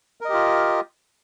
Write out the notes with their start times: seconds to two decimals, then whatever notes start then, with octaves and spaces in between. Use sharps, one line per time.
0.21 A#4
0.25 D#5
0.29 G4
0.33 F4